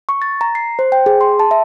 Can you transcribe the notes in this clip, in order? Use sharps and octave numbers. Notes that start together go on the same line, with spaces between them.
C#6
A6
A#5
C7
C5
G5
G#4
C6
A5
E5